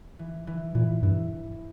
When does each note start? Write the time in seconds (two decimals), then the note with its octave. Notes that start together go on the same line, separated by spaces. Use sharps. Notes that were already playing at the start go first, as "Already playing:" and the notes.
0.19 E3
0.47 E3
0.75 A#2 E3
1.02 G2 E3